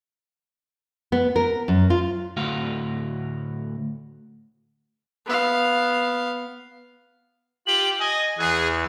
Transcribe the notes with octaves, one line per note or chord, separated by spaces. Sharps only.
B3
A#4
F#2
F4
D2 A2 F#4 F5
B3 F5
F4 G4 F#7
D#5 G#5
E2 G#4 F#6